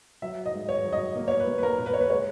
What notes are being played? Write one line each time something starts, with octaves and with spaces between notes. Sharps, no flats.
F#3 E5
D#5
G#2
C#5
F#3
D#5
A#3
C#5
B4
A#3
B4
A#4
A#2
B4
C#5
B4
G#3 C#5